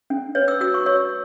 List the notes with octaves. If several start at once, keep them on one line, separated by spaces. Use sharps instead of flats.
C#4
B4 C#5
E6
F#4 E6
C#6
C#5 E6